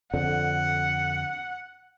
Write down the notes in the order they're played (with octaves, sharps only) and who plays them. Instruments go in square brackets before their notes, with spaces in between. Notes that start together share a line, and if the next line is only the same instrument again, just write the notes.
[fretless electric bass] F2 D3 [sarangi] F#5